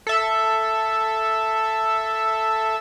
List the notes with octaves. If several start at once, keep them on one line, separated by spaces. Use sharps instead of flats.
A4 E5